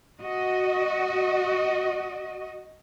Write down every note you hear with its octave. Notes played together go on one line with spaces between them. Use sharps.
F#4 D#5